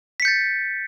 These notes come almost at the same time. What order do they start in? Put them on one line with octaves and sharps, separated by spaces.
B6 C#7 G6 A6